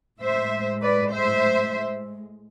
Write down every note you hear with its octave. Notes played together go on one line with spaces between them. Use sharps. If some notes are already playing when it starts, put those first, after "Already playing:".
A2 G#3 C5 E5
B4 D5
C5 E5